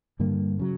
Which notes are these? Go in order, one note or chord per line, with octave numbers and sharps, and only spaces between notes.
G2 D3 G3 A#3
C#3 F#3